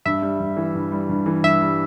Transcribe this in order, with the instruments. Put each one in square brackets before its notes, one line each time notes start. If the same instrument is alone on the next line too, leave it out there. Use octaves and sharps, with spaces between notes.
[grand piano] G2 [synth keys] E5
[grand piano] G3
G2
E3
G2
G3
G2
E3
[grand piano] G2 [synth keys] E5
[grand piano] G3